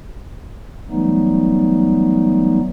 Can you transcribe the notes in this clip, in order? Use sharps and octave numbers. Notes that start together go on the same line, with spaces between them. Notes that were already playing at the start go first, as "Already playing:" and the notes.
E3 F#3 G3 A3 B3 D#4